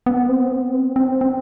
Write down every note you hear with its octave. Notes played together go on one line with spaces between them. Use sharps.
B3
C4
B3
C4
C4
C4